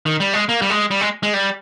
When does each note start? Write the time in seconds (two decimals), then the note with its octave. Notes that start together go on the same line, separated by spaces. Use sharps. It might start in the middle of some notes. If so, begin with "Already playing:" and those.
0.06 D#3
0.20 G3
0.34 G#3
0.49 A#3
0.62 G3
0.70 G#3
0.91 G3
1.01 G#3
1.23 G#3
1.34 G3